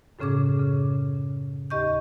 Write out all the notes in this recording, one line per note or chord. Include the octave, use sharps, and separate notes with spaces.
F#2 A2 C#3 C#4 G#4 D6
C#3
D#2 G4 D#5 C#6 G6